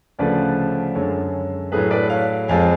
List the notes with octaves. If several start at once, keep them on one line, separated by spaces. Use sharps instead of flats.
D2 C#3 F3 A3 B4 D5
F#2 D3 G#3 A4 C#5
A2 F#3 A3 G#4 B4
B4 D5
C#5 F5
F2 F3 G#3 F5 G#5